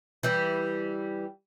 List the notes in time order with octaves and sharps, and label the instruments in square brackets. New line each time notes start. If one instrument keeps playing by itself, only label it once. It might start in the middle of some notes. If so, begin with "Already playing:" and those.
[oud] E3 G3